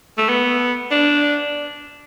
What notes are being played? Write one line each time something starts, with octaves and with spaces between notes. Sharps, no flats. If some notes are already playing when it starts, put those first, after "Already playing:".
A3
B3
D4